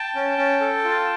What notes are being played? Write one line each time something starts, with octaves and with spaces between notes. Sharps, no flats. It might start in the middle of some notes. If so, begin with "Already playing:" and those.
Already playing: G5 A5
C#4
C#4
A4
F4